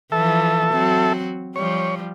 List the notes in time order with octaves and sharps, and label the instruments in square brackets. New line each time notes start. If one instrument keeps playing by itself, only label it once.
[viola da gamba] E3 F3 [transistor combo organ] A4 E5
[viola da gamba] F#3 C4 F#4
[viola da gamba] F3 G3 [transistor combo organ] C#5